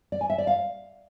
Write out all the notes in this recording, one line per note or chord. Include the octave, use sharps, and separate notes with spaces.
D5
G#5
E5
D5
F5